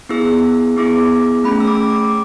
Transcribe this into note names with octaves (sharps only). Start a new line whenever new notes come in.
B3 E4 G#4 E6
B3 E4 G#4 D6
A3 C#4 G#4 B5
E6
D6
D6